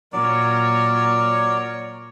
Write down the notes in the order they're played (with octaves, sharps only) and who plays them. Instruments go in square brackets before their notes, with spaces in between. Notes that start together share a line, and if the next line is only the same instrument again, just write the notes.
[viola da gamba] A#2 [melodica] F#3 D5 [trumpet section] A#4 C#5